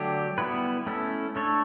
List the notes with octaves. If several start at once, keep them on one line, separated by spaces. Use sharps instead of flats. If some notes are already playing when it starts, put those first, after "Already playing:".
Already playing: D3 F#3 A3 D4 G4
G3 B3 E4 B4
A3 C#4 E4 A4
A3 D4 A4 C#5